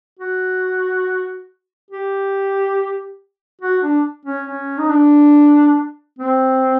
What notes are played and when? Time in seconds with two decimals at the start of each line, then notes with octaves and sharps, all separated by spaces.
0.20 F#4
1.91 G4
3.61 F#4
3.83 D4
4.25 C#4
4.47 C#4
4.78 D#4
4.90 D4
6.19 C4